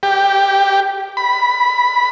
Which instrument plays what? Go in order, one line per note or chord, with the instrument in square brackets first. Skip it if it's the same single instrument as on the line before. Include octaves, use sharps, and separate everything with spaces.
[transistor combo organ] G4
B5